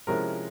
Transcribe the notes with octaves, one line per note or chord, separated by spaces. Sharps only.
C3 F3 G#3 C#4 E4 A#4